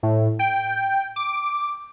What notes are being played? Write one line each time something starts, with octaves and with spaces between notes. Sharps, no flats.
A2
G5
D6